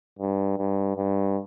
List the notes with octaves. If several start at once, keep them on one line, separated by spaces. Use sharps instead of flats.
G2
G2
G2